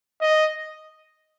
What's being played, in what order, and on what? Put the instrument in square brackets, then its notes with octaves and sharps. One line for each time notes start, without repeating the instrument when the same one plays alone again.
[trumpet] D#5